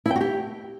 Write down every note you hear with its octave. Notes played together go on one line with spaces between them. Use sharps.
E4
G5
F#4
G4